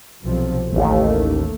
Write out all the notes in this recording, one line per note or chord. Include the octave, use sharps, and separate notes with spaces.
B1 C3 F3
A1 D#2 A3 A#3